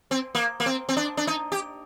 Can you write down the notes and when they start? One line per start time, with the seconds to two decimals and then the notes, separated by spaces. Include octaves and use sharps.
0.11 C4
0.35 A#3
0.60 A#3
0.66 C4
0.89 C4
0.97 D4
1.17 D4
1.27 D#4
1.52 G4